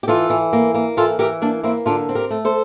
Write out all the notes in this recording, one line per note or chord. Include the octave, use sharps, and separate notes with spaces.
G4
E3 F4 A4
E3
A#3
A#3
E3 F4 A4
E3 G4 A#4
A#3 D4
A#3 C4 E4
D3 D4 F4
C4
G4 A#4
A3
A4 C5